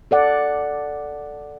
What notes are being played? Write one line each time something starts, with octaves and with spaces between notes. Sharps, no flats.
A4 D5 F#5